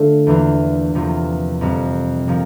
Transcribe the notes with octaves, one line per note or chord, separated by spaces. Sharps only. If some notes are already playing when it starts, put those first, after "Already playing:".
Already playing: D3 A3 D4 F4
E2 E3 A#3 D4 F4
E2 C3 F3 A#3 F4
F2 C3 G3 C4
C3 F3 A#3